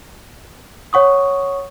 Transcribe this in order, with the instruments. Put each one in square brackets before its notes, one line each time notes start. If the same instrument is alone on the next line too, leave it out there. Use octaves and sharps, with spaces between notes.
[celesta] C#5 F#5 C#6 D#6